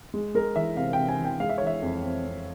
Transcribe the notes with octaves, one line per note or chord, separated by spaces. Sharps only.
G#3
G#3 A#4
E3 E5
C3 F5
G5
C3
G#5
E3
G5
G#3 F5
E5
E3 C#5
E5
F2
C4
C4